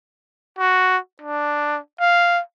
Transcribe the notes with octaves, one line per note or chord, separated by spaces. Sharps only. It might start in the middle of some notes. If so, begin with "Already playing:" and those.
F#4
D4
F5